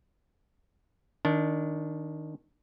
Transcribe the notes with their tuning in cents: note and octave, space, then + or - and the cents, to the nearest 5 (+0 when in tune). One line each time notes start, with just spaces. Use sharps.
D#3 +0 D4 -20